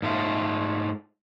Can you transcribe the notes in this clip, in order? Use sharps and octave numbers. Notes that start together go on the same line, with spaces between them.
G#2 A3 F4